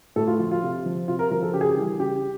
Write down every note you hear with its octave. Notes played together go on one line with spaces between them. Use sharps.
A2 A4
F4
F3 F4
F4
C3
F3
C3 F4
A#4
F3 A#4
A4
C#3 G4
G#4
G4
E3 G3
C#3 G4